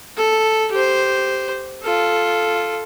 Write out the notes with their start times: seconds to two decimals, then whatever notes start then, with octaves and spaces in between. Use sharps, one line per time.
0.17 A4
0.72 G4 C5
1.83 F4 A4